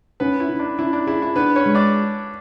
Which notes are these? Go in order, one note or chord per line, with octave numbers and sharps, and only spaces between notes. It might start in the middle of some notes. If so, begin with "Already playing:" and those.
B3 C#4 B4
E4
C#4
D4
C#4 E4
D4
E4 G#4
E4
B3 D4 B4
C#4 C#5
G#3
D4 D5